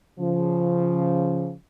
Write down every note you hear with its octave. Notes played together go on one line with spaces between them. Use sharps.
C#3 F3